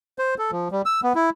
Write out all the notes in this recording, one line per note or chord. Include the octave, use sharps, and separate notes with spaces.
C5
A4
F3
G3
E6
B3
E4